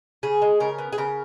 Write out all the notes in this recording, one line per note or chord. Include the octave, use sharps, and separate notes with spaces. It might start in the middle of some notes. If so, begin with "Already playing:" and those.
C#3 G#4
G#3
C#3 A#4
B3
G#4
C#3 A#4